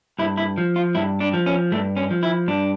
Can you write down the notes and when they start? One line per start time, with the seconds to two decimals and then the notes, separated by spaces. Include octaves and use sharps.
0.19 G2 E4
0.37 E4
0.58 F3
0.76 F4
0.95 G2 E4
1.20 D4
1.33 F3
1.46 C#4
1.72 G2 A3
1.97 C#4
2.10 F3
2.23 E4
2.48 G2 D4